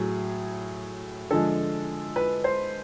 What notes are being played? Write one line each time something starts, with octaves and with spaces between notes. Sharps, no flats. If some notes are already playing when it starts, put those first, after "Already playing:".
Already playing: A2 F#3 G#4
D3 F3 G#3 A4
B4
C5